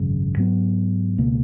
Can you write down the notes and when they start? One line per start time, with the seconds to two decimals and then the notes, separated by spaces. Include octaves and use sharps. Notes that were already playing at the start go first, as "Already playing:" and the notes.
Already playing: G#1 F#2 C#3
0.37 G#2 F#3 B3
1.18 C#2 B2 A#3